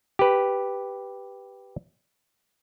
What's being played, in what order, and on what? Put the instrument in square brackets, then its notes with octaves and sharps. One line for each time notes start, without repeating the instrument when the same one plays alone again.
[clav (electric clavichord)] G4 B4